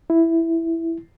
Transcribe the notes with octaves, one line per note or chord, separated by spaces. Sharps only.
E4